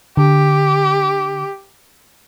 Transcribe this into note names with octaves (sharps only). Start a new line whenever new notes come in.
D3 G4